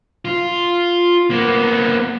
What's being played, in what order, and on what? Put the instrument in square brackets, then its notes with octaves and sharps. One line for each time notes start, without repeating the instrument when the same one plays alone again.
[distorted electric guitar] F4
A#3 B3